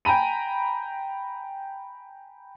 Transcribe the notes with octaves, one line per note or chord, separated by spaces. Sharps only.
G5 G#5 A#5 B5 D#7